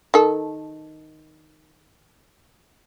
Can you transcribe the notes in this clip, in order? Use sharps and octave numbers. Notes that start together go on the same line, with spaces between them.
D#3 A4